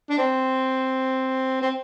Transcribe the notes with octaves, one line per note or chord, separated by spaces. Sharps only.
D4
C4
C4